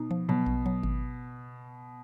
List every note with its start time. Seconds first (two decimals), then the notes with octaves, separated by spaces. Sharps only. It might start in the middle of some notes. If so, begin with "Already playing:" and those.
Already playing: B2 D#4
0.11 F3
0.29 B2 F#3
0.46 A#1
0.66 F#3
0.83 G#1